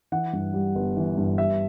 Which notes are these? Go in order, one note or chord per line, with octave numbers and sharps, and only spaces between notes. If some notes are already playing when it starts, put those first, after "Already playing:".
E3 F#5
G2
G3
G1
E3
G2
G3 E5